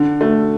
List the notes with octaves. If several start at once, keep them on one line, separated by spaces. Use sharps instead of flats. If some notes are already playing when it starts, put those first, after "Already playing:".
Already playing: D3
A3